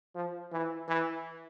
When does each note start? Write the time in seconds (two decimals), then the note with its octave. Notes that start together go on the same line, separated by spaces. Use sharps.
0.15 F3
0.52 E3
0.88 E3